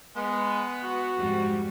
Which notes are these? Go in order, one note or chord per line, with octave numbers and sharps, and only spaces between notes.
G#3 B3
F#4
F2 G#2 G3